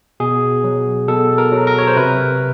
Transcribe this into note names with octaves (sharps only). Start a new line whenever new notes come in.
B2 G#4
F#3
B2 A4
A#4
F#3
A#4
C#5
C5
C3 B4